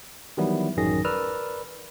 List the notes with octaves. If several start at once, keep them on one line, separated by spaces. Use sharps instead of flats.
D#3 E3 F#3 G3 B3 E4
A1 F#2 D#3 F#3 G#4 A#6
A#4 B4 D5 E6 F6